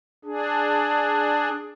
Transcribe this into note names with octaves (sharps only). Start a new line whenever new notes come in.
D4 G#4